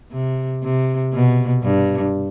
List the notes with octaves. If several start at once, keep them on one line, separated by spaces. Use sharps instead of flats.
C3
C3
B2
G2